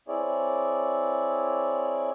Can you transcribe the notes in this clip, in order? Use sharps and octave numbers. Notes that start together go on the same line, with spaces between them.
C4 E4 G#4 C#5 D5